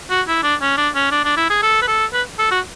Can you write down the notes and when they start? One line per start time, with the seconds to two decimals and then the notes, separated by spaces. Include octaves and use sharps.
0.10 F#4
0.27 E4
0.43 D4
0.61 C#4
0.77 D4
0.95 C#4
1.12 D4
1.25 D4
1.37 E4
1.50 G#4
1.63 A4
1.82 B4
1.88 A4
2.13 B4
2.39 A4
2.51 F#4